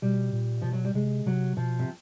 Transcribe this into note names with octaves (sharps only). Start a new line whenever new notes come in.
B2 G3
A#2
B2 F3
F#3
G3
C3 G#3
C3 F#3
B2 F3
C3